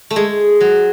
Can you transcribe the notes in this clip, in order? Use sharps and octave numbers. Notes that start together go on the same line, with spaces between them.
A3
G#3
F#3